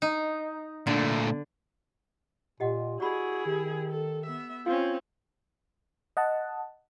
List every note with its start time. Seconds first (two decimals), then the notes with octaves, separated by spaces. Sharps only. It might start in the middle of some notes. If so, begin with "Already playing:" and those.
0.02 D#4
0.87 A#2 D3 A3
2.60 A#2 G4 D#5 F#5
3.00 E4 F#4 G#4 D5 F#5 B5
3.45 D#3 G4
3.91 A4
4.25 B3 E5
4.66 C4 C#4 F4 F5
6.17 D#5 F#5 A5